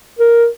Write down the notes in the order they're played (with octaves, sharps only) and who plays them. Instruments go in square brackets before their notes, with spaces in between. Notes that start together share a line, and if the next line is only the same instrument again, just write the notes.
[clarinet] A#4